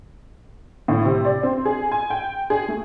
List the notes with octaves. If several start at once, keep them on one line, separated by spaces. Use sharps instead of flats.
A2
C3
D5
C4
G#4
G#5
G5
G#4
A3